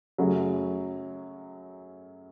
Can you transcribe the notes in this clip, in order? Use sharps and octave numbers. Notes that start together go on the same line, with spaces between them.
F#2 C#3 F#3 A3